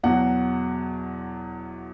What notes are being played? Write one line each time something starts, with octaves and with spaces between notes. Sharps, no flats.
E2 B2 F#3 F#5